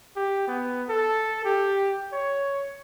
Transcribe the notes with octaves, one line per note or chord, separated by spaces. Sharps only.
G4
B3
A4
G4
C#5